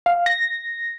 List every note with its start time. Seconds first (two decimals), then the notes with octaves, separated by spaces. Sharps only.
0.06 F5
0.26 A#6